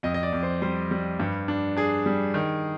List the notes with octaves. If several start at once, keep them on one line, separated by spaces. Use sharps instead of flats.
F2 D#5
D#5
D5
F2
C5
G3 C5
G3
G2
D4
D4 G#4
G3
D#3